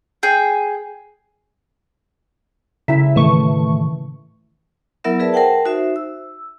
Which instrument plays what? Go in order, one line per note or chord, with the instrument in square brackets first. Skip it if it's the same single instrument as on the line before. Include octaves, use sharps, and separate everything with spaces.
[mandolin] G#4 G5
[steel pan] C#3 E4 [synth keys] E5
[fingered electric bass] A2 D#3 [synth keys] E3 A3 C#6
[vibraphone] F#3 B3 E4 A#4 E5 F#5
G#4 A#4 B4 D5 E5 A5
A#4 C5 F#5 G5 A5
D#4 F#4 C5 E5
E6